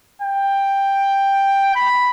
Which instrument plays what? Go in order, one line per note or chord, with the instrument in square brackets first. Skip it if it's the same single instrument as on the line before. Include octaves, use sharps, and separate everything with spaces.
[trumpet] G5
B5